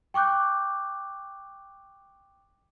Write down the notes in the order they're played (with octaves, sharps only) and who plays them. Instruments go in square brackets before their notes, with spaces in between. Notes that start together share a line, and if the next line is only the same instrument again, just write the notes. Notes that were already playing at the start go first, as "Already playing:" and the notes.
[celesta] G5 C#6 D6 F#6 G6